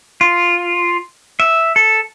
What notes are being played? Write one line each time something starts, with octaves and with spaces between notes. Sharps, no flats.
F4
E5
A4